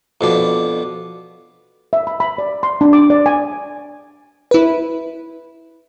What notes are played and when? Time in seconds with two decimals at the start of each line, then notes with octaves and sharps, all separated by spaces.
0.21 F2 B2 D4
1.93 E5
2.07 B5
2.20 B5
2.38 D5
2.63 C6
2.81 D4
2.93 D6
3.10 D5
3.26 G#5
4.51 E4 B4